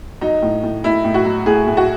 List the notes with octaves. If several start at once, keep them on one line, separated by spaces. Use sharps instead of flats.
F#3 D#4
A2
A2
A2 E4
A2
F#4
F#3
A2 G#4
A2
F#4